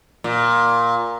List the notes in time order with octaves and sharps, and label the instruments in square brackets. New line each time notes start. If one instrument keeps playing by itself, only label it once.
[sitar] A#2